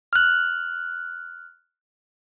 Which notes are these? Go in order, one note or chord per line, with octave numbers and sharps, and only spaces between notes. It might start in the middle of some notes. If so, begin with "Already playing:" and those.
F6 F#6